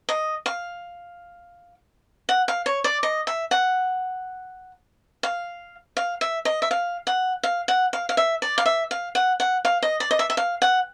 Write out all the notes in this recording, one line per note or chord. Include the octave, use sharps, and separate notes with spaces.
D#5
F5
F#5
F5
C#5
D5
D#5
E5
F#5
F5
F5
E5
D#5
E5
F5
F#5
F5
F#5
F5
F5
E5
D5
F5
E5
F5
F#5
F#5
F5
D#5
D5
D#5
E5
E5
F5
F#5